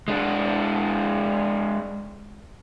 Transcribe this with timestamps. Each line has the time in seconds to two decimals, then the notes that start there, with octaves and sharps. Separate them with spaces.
0.08 G#3 D4